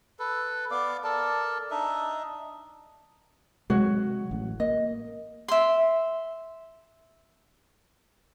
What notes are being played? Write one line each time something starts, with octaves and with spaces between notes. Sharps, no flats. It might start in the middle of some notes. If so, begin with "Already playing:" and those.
A4 B4
B3 D5 F5 D6
A4 A#4 D5 A5
D4 D#4 D#5 E5
C3 F#3 G#3 F#4 C#5
A1
A#3 D#5
E5 C6